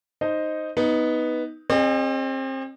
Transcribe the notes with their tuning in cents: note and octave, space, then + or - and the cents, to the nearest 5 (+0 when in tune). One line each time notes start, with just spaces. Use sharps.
D#4 +0 C5 +0 D#5 +0
B3 +0 D#4 +15
C4 +30 G#4 -10 D#5 -40